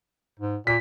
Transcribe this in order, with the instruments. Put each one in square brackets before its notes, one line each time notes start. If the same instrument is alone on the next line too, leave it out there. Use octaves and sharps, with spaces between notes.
[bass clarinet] G#2
[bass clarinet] A#2 [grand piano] B6